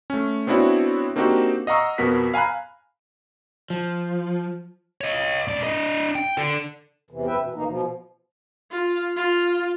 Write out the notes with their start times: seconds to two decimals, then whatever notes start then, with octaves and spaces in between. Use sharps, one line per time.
0.10 A3 C#4
0.47 B3 C4 D4 E4 F#4 C#5
1.16 A#3 C4 D4 D#4 F#4 G4
1.67 D#5 F5 F#5 A#5 C#6 E6
1.98 F2 B2 B3 F#4 A#4 B6
2.34 F5 G#5 A#5 B5 F#6
3.70 F3
5.01 C#5 D#5
5.48 G#2 D5
5.64 D4 D#5
6.16 G5
6.38 A4 D5
7.11 E2 C3 E3
7.26 F#2 B4 E5 G5
7.41 B2 E3
7.54 D2 E3 A#3 D#4
7.67 B2 F3
8.72 F4
9.17 F4